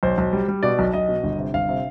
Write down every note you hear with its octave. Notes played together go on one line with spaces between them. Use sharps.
B1 C5
B1
G3
G3
B2 D5
B1
B1 D#5
B2
G1
C3
G1 F5
C3